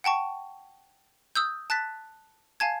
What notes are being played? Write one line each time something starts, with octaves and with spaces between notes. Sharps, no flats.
F#5 G5 A5 C#6
D#6 E6 G6
A5 F#6 A6 B6
F5 G#5 A5 G#6